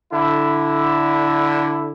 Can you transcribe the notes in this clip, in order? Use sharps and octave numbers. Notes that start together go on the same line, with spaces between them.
D3 E4